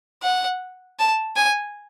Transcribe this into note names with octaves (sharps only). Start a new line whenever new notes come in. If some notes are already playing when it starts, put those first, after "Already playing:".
F#5
A5
G#5